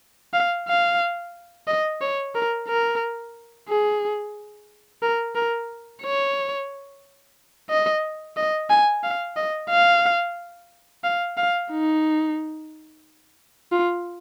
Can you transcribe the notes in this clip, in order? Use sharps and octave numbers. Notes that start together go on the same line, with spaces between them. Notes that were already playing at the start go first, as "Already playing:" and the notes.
F5
F5
D#5
C#5
A#4
A#4
G#4
A#4
A#4
C#5
D#5
D#5
G#5
F5
D#5
F5
F5
F5
D#4
F4